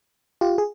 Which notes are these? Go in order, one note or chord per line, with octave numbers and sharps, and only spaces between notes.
F4 G4
G#4